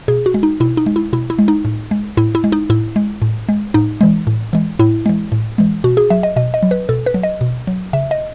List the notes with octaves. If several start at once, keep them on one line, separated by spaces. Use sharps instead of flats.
B2 G#4
F#4
G#3
D#4
B2 E4
D#4
G#3
E4
B2 E4
E4
G#3
D#4
A2
G#3
A2 E4
E4
G#3
D#4
A2 E4
G#3
A2
G#3
A2 D#4
E3 G#3
A2
E3 G#3
A2 E4
E3 G#3
A2
E3 G#3
B2 F#4
G#4
F#3 E5
D#5
B2 D#5
D#5
F#3
B4
B2 A4
B4
F#3
D#5
B2
F#3
C#3 E5
D#5